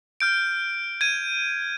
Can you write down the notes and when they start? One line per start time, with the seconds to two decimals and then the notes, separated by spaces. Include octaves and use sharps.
0.20 F6 G6 D7
1.01 G#6 D#7